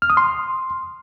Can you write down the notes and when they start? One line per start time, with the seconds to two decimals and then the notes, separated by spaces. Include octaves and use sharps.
0.02 F6
0.10 D#6
0.17 C6